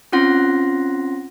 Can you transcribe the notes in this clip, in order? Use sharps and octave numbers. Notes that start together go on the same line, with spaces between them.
C4 C#4 F4 F#5 C6 A#6